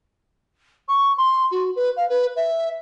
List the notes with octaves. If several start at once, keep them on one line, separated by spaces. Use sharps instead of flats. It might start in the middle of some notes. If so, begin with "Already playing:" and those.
C#6
C6
F#4
B4
F5
B4
E5